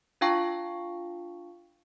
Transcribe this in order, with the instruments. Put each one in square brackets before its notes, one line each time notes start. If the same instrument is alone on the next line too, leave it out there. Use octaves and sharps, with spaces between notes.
[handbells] D4 F4 F5 G5 A5 C#6